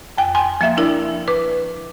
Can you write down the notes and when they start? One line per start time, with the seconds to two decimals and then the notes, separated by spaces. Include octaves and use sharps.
0.18 F2 G5 G#5
0.34 G#5 C6
0.61 F3 A#3 E5
0.77 D4 E4 A#4 D5
1.28 B4 D6